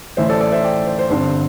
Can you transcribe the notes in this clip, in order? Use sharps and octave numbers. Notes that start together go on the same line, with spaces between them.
A1 A2 E3 C5 E5
A4 D5
A4 D5
C5 E5
D5 G5
C5
C5
G1 G2 D3 C4 C5